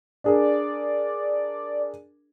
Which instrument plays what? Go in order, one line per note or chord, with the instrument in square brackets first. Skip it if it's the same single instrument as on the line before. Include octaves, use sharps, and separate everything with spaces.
[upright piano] D4 G#4 A#4 [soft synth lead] D5